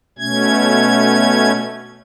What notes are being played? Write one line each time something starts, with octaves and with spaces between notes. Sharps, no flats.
B2 A3 C#4 G#6